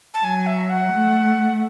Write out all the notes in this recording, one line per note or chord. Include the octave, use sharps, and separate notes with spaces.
A5
F#3 G#5
E5
F#5
A3